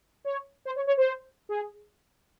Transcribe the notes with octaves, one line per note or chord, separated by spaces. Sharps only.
C#5
C5
C#5
C#5
C5
G#4